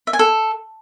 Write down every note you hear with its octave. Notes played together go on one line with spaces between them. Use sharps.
E5
G#5
A4